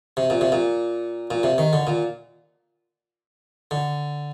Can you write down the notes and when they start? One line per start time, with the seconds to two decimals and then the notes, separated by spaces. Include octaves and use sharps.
0.17 C3
0.30 A#2
0.41 C3
0.52 A#2
1.31 A#2
1.43 C3
1.58 D#3
1.73 D3
1.87 A#2
3.71 D3